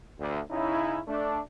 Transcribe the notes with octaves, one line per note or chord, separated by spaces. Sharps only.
D2
C#3 C#4 D#4 E4
A3 D4